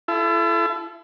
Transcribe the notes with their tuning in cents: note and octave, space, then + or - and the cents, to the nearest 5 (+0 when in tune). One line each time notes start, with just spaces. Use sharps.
E4 +35 A4 -20